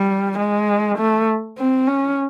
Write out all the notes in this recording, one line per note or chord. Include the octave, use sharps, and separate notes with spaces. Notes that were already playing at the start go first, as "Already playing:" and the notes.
Already playing: G3
G#3
A3
C4
C#4